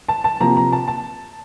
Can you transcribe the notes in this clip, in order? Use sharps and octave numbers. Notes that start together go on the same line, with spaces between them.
A5
A5
C3 F3 A#3 A#5
A#5
A5
A5